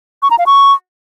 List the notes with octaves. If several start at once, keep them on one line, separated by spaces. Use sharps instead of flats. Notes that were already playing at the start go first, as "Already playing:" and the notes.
C#6
A#5
F5
C#6